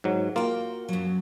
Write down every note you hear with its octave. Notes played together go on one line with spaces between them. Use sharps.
G#2 F#3
A#3 F4 F#4 G5
F#2 F#3